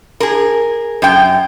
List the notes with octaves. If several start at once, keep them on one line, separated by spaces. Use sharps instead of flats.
G#4 A#4
F#2 G5